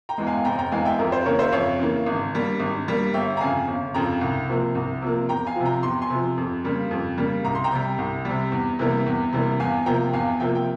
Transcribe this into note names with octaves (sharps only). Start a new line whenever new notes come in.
G5 A#5
E2 E3 G#3
F5 G#5
G#5
F1 G5 A#5
G5 A#5
E2 E3 G#3 F5 G#5
E5 G5
F2 A#4
C5
C#3 E3 A#3 A#4 C#5
C5 E5
F2 C#5 F5
C#3 E3 A#3
G#1
G2 G3 A#3
G#1
G2 G3 A#3
G1 E5 G5
A#5
F2 C#3 F5 G#5
G1
F2 C#3 G5 A#5
C2
C3 F3 A#3
C2
C3 F3 A#3
E2 G5 A#5
F5 G#5
C3 F3
G5 A#5
E2 C6
G#5 C6
C3 F3
F2
C#3 G3 A#3
F2
C#3 G3 A#3
C2 A#5
C6
G5 A#5
C3 G3
C2
C3 G3
E2
C3 E3 G3 A#3
E2
C3 E3 G3 A#3
E2 F5 G#5
C3 F3 A#3 G5 A#5
E2 F5 G#5
C3 F3 A#3 E5 G5
G5